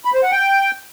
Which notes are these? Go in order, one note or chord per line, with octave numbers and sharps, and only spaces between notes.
B5
C5
F#5
G5